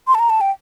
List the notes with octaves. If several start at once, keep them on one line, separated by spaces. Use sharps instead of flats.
C6
A5
A#5
A5
G5